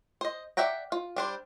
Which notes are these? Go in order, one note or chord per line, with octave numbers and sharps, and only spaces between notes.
C5 D#5
D5 E5 F#5 G5 A#5
F4
G3 D4 C5